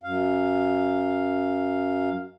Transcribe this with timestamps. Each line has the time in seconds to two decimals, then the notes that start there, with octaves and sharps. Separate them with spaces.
0.03 F#2 F5